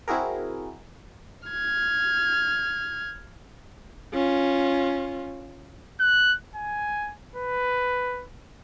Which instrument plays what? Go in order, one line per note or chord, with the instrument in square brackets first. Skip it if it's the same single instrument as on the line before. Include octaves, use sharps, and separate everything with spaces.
[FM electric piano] C4 E4 F#4 G#4 A#4
[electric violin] F6 G#6
[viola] C#4 F4
[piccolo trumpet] F#6
G#5
B4